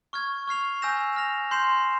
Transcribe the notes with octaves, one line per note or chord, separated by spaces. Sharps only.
C#6 F6 G#6
C#6 F6 C7 F7
G#5 E6 G6 A#6 E7
F6 A#6 F7
C6 G6 C7 E7